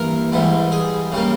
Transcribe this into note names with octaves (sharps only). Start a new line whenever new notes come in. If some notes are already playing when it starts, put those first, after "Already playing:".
Already playing: G2 E3 A#3 A#4
G#2 E3 G3
G#4
C#3 G3 A#3